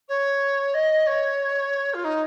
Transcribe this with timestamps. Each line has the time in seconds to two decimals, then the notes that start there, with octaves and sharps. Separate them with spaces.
0.08 C#5
0.74 D#5
1.06 C#5
1.94 F4
2.04 D#4